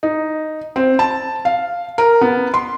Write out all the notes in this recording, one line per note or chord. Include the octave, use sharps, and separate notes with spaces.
D#4
C4
A5
F5
A#4
B3
C6